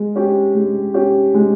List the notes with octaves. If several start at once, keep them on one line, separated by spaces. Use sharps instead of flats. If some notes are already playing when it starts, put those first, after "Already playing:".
Already playing: G#3
C#4 G4
G#3
C#4 G4
G#3